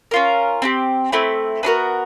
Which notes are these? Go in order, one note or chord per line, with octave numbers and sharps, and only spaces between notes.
C#4 F4 A#4
C4 E4 G4
A3 C4 E4
B3 D4 F#4 A#4